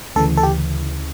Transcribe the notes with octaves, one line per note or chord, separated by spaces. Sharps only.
D2 C#3 E3 A4
A4
G4